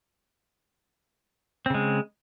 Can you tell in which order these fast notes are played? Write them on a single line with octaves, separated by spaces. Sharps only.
C4 C#3 G#3